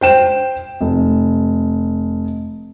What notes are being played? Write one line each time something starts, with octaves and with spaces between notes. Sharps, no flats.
C5 G5 E7
F1